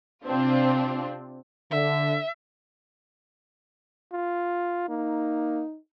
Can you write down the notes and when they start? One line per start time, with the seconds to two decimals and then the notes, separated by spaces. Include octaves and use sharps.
0.24 C3 C4 D4 F4
1.71 D3 E5
4.13 F4
4.89 A#3 D#4